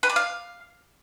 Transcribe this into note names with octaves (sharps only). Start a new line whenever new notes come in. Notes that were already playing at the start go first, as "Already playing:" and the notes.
B4
D5
F5